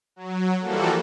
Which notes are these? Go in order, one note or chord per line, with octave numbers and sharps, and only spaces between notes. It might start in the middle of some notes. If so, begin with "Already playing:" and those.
F#3
E3 F3 G3 A#3 F#4 A4